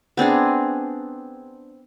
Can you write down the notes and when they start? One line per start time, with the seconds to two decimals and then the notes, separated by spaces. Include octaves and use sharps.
0.17 B3 C4 D4 G#4